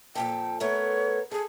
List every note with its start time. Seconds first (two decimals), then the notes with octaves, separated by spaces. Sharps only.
0.15 F2 A#2 A4 G5
0.60 A3 B3 A#4 C#5
1.32 G#4 A4